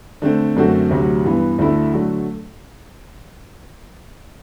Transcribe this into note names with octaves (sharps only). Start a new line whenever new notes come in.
D3 A3 C4
F#2 D3 A3 C4 F#4
D2 C3 F#3
G2 E3 B3
D2 D3 A3 E4
D3 F#3 A3